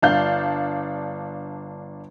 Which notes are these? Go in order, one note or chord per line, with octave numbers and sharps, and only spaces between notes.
G1 D4 F5 G6